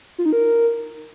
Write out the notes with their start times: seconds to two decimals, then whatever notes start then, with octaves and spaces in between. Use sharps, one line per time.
0.18 F4
0.25 D#4
0.33 A#4